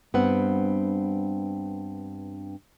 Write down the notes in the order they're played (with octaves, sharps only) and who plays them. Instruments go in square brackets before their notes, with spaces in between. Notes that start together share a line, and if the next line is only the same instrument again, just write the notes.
[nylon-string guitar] G2 B3 C4 F#5